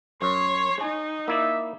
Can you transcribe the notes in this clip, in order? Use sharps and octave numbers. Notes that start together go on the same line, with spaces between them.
F#2 C#5 C6
D#4 G#5
A#3 E4 D5 E5